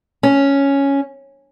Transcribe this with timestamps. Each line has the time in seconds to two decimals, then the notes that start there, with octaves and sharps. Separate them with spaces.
0.23 C#4